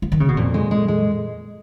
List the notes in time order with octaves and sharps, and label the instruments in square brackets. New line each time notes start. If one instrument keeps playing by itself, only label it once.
[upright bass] F3
D#3
C#3
B2
[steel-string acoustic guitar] F2 [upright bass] A#2
[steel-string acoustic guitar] G#3
G#3
G#3